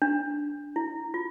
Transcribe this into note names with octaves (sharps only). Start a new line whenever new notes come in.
D4
E4
F4